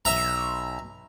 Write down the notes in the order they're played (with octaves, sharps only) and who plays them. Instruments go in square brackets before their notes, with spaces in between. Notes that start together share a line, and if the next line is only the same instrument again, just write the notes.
[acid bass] B1 [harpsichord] E5 A#5